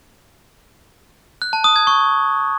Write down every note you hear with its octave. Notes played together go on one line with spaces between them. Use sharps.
F#6
A5
D#6
G#6
C#6